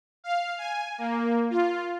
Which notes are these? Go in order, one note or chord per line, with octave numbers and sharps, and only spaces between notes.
F5
G#5
A#3
F4